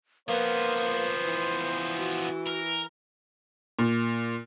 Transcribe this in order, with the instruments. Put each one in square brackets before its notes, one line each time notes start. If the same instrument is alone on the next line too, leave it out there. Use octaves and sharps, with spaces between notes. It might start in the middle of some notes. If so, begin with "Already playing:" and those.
[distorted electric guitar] F3 B3 [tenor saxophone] A#3 [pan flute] B4 [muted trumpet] C5
[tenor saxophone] E3
[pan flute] F#4
[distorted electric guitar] A#4
[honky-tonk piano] A#2